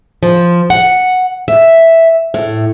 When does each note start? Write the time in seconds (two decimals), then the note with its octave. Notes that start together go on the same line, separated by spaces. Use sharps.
0.23 F3
0.70 F#5
1.48 E5
2.34 A2